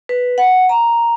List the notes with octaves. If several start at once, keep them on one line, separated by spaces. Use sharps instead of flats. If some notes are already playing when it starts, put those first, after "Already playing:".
B4
F#5
A#5